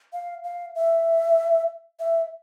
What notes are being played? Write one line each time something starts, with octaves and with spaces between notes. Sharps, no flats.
F5
F5
E5
E5